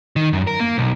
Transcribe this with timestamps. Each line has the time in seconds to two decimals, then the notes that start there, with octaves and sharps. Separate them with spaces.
0.16 D#3
0.33 F#2
0.47 A#4
0.60 A#3
0.78 B1